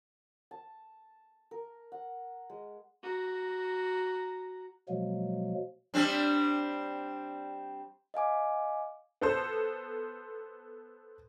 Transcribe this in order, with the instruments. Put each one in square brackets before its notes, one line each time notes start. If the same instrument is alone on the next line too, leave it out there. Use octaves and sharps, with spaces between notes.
[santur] A5
A#4
F#5
G#3
[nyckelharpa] F#4 A#5
[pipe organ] B2 F3 F#3 G#3 A#3
[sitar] G3 C4 D4
[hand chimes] D#5 F5 G#5 D6
[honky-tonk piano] B3 A4 C5